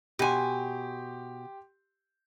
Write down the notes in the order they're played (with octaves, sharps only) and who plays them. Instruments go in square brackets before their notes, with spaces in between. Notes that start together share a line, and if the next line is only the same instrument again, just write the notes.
[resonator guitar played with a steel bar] B2 G#5 [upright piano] G4 C6